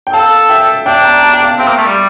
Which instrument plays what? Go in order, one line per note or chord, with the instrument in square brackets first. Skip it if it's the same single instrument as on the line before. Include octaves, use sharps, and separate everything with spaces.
[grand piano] G5
[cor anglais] A4 [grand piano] F5 A5
[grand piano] E5 G5
[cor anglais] D4 [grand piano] E5 G5
[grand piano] G5 A#5
A5
G5
F5 A5
[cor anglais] C4 [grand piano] E5 G5
[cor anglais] A#3
A3
G3